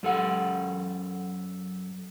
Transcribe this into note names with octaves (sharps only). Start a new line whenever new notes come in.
F#2 A4 F#5